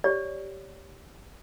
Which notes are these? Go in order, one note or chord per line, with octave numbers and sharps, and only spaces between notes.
G4 C#5 D5